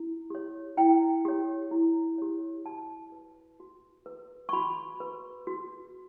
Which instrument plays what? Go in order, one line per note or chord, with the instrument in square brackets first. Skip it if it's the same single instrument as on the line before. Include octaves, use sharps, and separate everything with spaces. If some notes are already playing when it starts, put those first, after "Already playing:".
Already playing: [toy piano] E4
G4 C#5
E4 G5
G4 C#5
E4
G4 C#5
F#4 A5
B4
F#4
B4
C#6
F#4 B5
B4
F#4